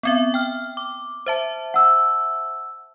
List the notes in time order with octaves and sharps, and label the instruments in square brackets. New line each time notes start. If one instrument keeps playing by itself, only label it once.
[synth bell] B3 C4 E5
G5 F6
D6
C5 E5 A5
[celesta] F#5 E6